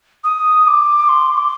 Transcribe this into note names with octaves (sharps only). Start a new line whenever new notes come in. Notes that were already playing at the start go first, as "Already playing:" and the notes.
D#6
D6
C6
D6